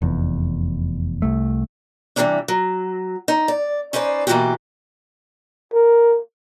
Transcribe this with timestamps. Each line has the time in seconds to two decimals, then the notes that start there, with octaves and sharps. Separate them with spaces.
0.02 F1 E2
1.22 C2 A3
2.16 C3 E3 G3 A3 A#3 D4
2.48 F#3
3.28 D#4
3.48 D5
3.93 C#4 D#4 B4 C5 D5
4.27 B2 E3 F#3 A#3 F#4 G4
5.74 A#4